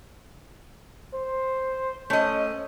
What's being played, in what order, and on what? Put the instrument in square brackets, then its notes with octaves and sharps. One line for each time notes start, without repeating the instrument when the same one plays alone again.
[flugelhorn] C5
[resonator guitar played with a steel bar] A3 D#5 [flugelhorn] C#4